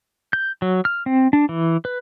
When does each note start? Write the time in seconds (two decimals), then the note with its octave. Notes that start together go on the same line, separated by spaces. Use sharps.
0.33 G6
0.62 F#3
0.85 F6
1.06 C4
1.33 D4
1.49 E3
1.85 B4